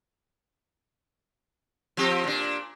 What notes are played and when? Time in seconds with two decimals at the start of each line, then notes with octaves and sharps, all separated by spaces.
1.97 F3 C4 G4
2.24 A#2 D4